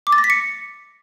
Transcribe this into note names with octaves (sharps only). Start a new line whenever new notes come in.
D6
A6
A#6
B6
C#7